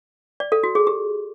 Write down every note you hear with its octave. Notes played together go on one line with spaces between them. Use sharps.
D5
A4
F#4
G#4
G4